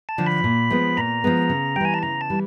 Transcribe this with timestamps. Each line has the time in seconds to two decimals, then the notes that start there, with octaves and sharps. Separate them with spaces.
0.09 A5
0.18 D3 F3
0.26 B5
0.44 A#2
0.70 F3 G#3 B3
0.97 A#2 A#5
1.24 F3 G#3 B3
1.49 C#3
1.76 G3 G5
1.81 E3 G#5
1.94 A5
2.03 C#3 A#5
2.21 A5
2.30 E3 G3